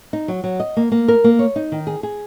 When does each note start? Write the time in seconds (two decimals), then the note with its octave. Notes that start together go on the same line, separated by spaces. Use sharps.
0.13 D#4
0.28 F#3
0.44 F#3
0.60 D#5
0.77 A#3
0.92 A#3
1.08 A#4
1.24 A#3
1.39 C#5
1.56 D#4
1.72 D#3
1.87 G#4
2.03 G#4